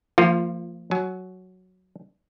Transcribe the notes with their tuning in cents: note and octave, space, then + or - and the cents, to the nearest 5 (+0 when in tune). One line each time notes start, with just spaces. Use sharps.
F3 -20 A#3 -40 F4 +0
F#3 +0 G#5 +40